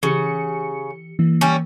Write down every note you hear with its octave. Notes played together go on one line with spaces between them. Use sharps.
C#3 E3 G4 C#7
E3 A#3
G3 C#4